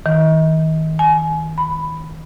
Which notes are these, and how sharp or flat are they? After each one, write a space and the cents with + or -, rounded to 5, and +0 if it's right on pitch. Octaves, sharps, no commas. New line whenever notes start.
D#3 +35
G#5 +30
B5 +5